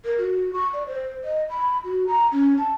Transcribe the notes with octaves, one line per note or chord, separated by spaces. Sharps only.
A#4
F#4
C#6
D5
C5
D#5
B5
F#4
A#5
C#4
A5